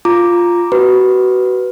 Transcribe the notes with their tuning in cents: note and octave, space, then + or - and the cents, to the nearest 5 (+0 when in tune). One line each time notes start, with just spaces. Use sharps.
F4 +0 A#5 +0 D6 +0
F#4 +25 B4 +0